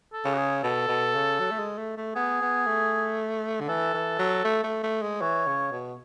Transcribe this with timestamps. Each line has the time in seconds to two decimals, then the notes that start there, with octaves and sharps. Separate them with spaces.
0.13 A4
0.25 C#3
0.33 F#4
0.38 G#4
0.63 B2 A4
0.88 B2
1.15 C#3
1.40 F#3
1.51 A3
1.59 G#3
1.78 A3
1.97 A3
2.16 B3 G#4
2.42 B3
2.66 A3
3.60 D3
3.69 E3 A4
3.94 E3
4.19 F#3
4.45 A3
4.64 A3
4.83 A3
5.02 G#3
5.21 E3 C#5
5.47 C#3
5.72 B2